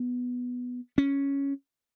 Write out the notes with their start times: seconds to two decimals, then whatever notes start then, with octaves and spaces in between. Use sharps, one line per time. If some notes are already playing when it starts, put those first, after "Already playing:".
Already playing: B3
0.98 C#4